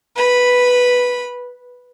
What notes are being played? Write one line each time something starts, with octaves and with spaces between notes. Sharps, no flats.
B4 B5